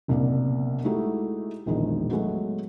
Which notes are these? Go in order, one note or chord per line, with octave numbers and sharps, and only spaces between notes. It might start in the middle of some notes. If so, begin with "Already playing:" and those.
F#1 C2 B2 A#3 D4
G#3 A3 D#4 E4 F#4 G4
E1 A#1 E2 D#3 G#3 D#4
F#3 G#3 A3 B3 F#4